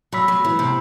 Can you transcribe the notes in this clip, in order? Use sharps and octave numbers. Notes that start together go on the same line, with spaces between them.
F#3 B5 E6 B6
F#3
E3
C3